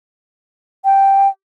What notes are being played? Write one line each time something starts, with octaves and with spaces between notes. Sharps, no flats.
G5